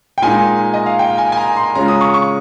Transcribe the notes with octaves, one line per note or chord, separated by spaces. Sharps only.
G5
A#2 G#3 D#4 G#5
D#5
F5
G5
G#5
G#5
A#5
C6
C#3 G#3 C#4 F4 A#5
D#6
C#6
C#6